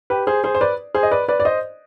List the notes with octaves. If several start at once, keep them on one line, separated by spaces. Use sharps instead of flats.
G4 B4
G#4 C5
G#4 C5
C5
B4 D5
G#4 C5
D#5
B4 D5
B4 D5
D5
C5 D#5